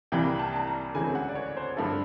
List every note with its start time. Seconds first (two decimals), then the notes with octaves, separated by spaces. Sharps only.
0.12 C2 C3 E3 G3 A#3 G5
0.39 A5
0.56 A5
0.67 A#5
0.94 D2 C#3 E3 G#3 C4 G#5
1.15 F#5
1.29 D5
1.35 C#5
1.57 C5
1.77 G2 D3 F3 A3 A4